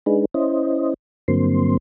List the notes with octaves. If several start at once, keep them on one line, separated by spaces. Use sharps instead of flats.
G#3 D4 D#4 G#4 B4
C#4 E4 C5 D#5
G2 D3 F#3 A#3 C4 C6